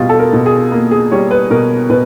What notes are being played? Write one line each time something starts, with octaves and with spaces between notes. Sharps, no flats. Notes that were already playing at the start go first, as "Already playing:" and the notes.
Already playing: B2 G3 F4 G4
A4
A#4
B2
G#4
A#3
G#4
G3 C#5
B4
B2 A#4
B2 B4